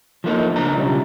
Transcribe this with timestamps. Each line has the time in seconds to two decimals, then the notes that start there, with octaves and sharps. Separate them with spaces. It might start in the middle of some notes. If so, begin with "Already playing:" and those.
0.24 F3 A3 A#3 D#4
0.56 C#2 D4 A#5
0.76 B1 C#3 G3 F4